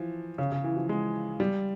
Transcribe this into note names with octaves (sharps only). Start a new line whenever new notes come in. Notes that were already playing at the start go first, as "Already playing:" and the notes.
Already playing: E3 F3
C#3
C#3
E3
F3
G#3
G3